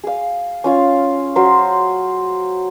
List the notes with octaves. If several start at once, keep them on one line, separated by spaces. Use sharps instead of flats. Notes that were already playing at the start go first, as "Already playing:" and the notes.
G#4 F5
C#4 F4 F5
F#3 C5 F5 C6